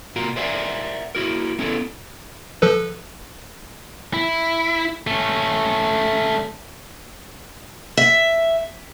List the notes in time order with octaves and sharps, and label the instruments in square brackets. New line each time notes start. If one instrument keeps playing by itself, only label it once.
[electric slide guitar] A#2 F4 F#4 A#4
A#4 C5 D5 E5 F#5 G#5
E4 F#4 A#4
A3 B3 C#4 E4 A4
[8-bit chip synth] F3 A4 B4
[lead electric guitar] E4
A3 C#4
[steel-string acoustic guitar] E5